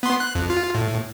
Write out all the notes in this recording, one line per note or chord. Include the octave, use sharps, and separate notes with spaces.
B3 C6
F#6
F2
F4
A2